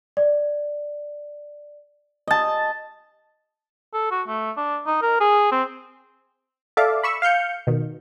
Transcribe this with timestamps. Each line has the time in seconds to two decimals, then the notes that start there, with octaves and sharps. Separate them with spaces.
0.17 D5
2.27 D#5 A5
3.94 A4
4.11 F#4
4.28 A3
4.57 D4
4.87 D#4
5.02 A#4
5.21 G#4
5.52 C4
6.77 A4 D5 E5 F5 A5 D6
7.03 B5 C#6 E6
7.22 F5 F6 G6 C#7
7.67 B2 D#3